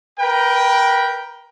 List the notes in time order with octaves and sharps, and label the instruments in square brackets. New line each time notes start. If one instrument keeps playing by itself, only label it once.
[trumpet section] A#4 B4 G5